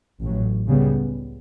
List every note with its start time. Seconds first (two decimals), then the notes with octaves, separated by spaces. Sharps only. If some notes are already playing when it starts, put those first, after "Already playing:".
0.22 A1 A2 F#3
0.67 C#2 C#3 G3 B3